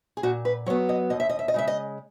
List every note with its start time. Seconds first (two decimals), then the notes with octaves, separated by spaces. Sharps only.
0.17 G#4
0.23 A#2 F#4
0.45 B4
0.66 F#3 B3 C#5
0.89 D#5
1.10 D#2 D#5
1.20 E5
1.29 D#5
1.39 E5
1.48 D#5
1.54 C#3 G#3 E5
1.67 D#5